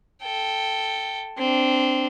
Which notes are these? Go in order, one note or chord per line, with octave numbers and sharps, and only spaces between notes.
A4 G5
C4 D4